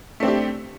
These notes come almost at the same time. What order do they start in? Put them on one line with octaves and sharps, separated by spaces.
A3 C4 D4 G4